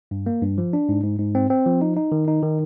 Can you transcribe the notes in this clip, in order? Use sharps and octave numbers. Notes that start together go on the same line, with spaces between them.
G2
A#3
G2
F3
D4
G#2
G#2
G#2
C4
C4
F3
D#4
D#4
D#3
D#4
D#3